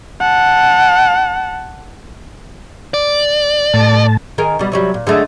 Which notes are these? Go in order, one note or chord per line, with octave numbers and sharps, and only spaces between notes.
F#5 A5
D5
A2 A5
D#3 G#4 A#4
B2 G3
C3 F#3 G3
A#2
D3 G#3 A3